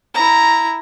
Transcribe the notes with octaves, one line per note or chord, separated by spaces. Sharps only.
E4 A#5